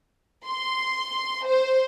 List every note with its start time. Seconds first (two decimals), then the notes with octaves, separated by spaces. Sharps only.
0.46 C6
1.45 C5